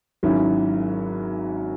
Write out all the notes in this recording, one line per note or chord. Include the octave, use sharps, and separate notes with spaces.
G#1 G#2 F#3 C#4 E4